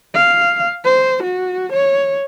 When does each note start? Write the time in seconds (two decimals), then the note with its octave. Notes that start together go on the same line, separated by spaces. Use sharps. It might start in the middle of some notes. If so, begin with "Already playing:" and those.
0.15 F5
0.85 C5
1.23 F#4
1.72 C#5